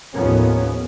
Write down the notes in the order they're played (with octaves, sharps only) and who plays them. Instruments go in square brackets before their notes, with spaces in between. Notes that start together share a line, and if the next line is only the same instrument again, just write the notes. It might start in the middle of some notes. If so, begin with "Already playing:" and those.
[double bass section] D#2 A2 F3 B3 C#4